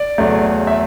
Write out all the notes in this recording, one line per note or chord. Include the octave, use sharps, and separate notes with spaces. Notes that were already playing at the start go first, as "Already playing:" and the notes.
Already playing: D5
E2 C#3 F#3 A3
E5